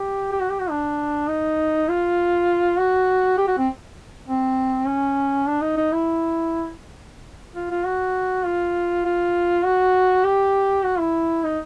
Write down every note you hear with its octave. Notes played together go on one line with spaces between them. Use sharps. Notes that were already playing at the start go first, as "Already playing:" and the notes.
Already playing: G4
G4
F#4
G4
F#4
D4
D#4
F4
F#4
G4
F#4
C4
C4
C#4
D4
D#4
D#4
E4
F4
F4
F#4
F4
F4
F#4
G4
F#4
E4
D#4